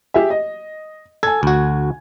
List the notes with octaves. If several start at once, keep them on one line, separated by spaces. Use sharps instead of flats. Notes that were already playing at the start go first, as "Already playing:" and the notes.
G4 G#4 E5
D#5
A4 G#5 G#6
D2 F#4